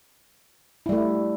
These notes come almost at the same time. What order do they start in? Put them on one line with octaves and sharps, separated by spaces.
E4 G3 A3